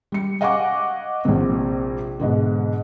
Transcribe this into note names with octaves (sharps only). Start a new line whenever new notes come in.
G3 C#7
D#5 F5 F#5 G#5 C#6 D6
A#1 C3
G#2 B2 D3